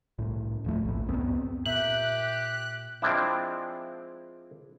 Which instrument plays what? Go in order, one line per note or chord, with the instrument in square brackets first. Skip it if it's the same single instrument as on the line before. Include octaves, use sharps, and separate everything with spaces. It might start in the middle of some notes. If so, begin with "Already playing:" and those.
[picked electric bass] C2 A2
D#1 F3 A3
A#1 A2
C#2 F#2 B3 C4
[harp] A#2 E5 [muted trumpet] G4 [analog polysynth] F#6 [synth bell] F#7
[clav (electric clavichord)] F3 G#3 C4 D4 E4